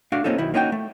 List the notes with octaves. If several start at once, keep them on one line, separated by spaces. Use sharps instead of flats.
A3 D4 F#4 D5 F5
A#3 C4 C#4 D#4 F4 A4
B1 D#3 E4
A#3 C#4 D#4 E4 F#4 G5
A3